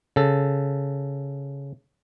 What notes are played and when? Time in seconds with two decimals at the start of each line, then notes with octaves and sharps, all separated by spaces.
0.16 C#3 A4